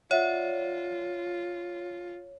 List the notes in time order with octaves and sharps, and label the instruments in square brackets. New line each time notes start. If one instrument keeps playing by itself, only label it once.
[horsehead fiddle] F4 [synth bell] C#5 [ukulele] D5 E5 F#5